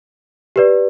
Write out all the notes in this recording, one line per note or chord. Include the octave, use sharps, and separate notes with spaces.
G4 B4 D5